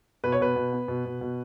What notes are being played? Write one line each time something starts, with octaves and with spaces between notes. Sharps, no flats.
B2 B4
C#5
B2 B4
B2
B3
B2
B2
B2